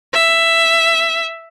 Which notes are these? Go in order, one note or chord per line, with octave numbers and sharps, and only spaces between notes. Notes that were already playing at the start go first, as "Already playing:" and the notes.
E5